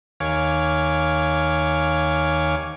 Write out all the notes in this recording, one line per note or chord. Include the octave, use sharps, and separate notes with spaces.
D#2 C#5 F5 G#5 D6